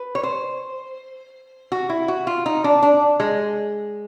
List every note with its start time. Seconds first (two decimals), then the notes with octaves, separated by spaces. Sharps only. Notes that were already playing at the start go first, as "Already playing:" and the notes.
Already playing: B4
0.15 C#5
0.23 C5
1.72 F#4
1.90 E4
2.08 F#4
2.27 F4
2.46 D#4
2.64 D4
2.83 D4
3.20 G#3